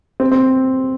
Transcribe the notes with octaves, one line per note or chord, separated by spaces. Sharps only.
C4
C4